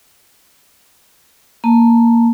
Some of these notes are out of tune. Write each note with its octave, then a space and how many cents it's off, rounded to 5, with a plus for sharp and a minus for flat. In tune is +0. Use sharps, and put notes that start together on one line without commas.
A#3 +0 A5 +0